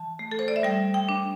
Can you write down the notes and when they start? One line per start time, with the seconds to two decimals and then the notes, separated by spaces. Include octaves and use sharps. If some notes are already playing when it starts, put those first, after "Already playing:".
Already playing: E3 A5
0.19 A3
0.31 A4
0.39 C5
0.48 D5
0.56 E5
0.63 G3 G5
0.94 G5
1.09 D4